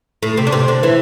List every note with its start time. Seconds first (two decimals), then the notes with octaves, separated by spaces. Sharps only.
0.23 A2
0.37 C3 C4
0.47 D4
0.52 C3 C4
0.68 D3 D4
0.83 E3 E4